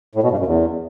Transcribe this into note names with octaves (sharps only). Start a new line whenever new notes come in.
A2
B2
G2
F#2
E2